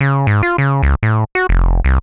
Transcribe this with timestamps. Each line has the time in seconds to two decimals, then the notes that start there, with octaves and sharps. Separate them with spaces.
0.01 C#3
0.27 G#2
0.43 F4
0.58 C#3
0.83 C#2
1.03 A2
1.35 F#4
1.49 F1
1.85 C2